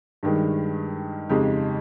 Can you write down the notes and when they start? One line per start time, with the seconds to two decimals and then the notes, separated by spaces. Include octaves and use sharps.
0.23 G2 D#3 G#3
1.29 F2 C#3 G#3 D#4 G4